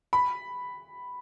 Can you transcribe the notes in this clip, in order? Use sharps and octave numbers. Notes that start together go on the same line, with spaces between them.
B5